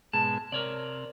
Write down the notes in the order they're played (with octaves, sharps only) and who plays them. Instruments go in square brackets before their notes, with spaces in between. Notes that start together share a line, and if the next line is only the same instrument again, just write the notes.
[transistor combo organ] G#2 B2 G#3 [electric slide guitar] A5
[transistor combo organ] C3 [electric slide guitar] A#4 C#5 D5